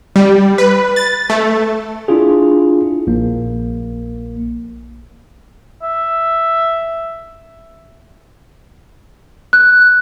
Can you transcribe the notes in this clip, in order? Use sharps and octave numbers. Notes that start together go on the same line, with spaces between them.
G3
B4
A6
A3
D4 E4 F4 G#4
A#1 A#3
E5
F#6